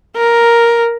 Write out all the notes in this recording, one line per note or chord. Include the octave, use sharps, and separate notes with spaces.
A#4